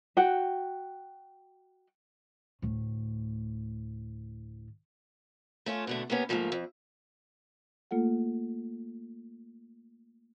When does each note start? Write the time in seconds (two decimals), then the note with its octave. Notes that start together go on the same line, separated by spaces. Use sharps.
0.17 F#4 F#5 G5
2.62 D2 A2
5.66 A3 C#4 F4
5.87 B2 D3 A3
6.10 C3 A#3 B3 C#4
6.29 G#2 F3 G3 A3 A#3
6.52 F2
7.91 A3 A#3 F4 A4 F#5